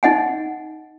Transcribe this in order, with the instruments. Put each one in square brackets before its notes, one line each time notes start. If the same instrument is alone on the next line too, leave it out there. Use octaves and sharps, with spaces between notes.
[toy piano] D#4 D#5 F#5 G#5